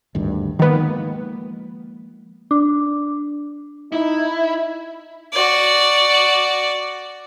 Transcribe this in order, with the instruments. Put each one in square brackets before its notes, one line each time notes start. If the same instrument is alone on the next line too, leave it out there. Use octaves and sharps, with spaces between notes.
[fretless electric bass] G#1 D2 G2
[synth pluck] D#3 B3 [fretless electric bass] F3 G#3 A#3
[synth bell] D4
[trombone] D#4 [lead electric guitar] E4
[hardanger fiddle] F#4 D5